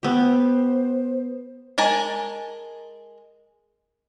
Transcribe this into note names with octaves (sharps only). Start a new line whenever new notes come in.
B3 G4 C5
G#3 A#4 G#5 A5